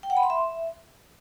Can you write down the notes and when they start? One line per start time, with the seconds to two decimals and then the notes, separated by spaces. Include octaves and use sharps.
0.03 G5
0.10 F#5
0.17 B5
0.23 C6
0.30 E5